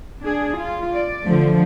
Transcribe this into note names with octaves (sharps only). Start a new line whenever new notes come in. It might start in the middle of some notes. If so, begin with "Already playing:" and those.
D4 G#4
F4
D5
D3 F3 A3